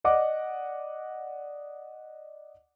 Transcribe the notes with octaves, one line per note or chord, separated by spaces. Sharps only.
D5 D#5 F#5 D6